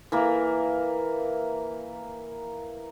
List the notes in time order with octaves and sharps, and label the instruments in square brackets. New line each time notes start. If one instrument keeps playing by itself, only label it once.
[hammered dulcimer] E3 A#3